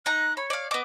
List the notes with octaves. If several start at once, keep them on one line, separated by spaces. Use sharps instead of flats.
D#4 A#5 F#6
C#5 B5
D5 F5
B3 D#5 D6